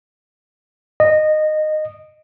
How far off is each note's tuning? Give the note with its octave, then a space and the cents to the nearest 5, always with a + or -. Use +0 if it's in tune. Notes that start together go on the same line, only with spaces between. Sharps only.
D#5 -15